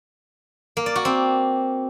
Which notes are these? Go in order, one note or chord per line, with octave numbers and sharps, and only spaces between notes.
A#3
D5
F#4
C4